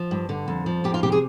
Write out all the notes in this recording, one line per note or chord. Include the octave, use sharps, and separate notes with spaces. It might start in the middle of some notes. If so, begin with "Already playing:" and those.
Already playing: F3
G2
D3
F2
F3
F2 G4
F4
C3 G4
G#4